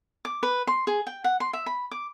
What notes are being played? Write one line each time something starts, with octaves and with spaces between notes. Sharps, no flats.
D6
B4
C6
G#4
G5
F#5
C6
E5
B5
D6